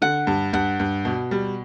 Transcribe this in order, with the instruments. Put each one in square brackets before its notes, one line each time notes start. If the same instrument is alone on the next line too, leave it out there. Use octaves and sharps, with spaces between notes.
[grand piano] D3 [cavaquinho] F#5
[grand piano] G2
[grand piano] G2 [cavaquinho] F#5
[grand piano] G2
B2
G3